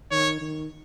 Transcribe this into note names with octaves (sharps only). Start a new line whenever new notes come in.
D#3 C#5
D#3